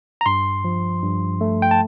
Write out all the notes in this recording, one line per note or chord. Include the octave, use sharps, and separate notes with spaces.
A#5
G2 C6
F3
G2
A3
G5
A5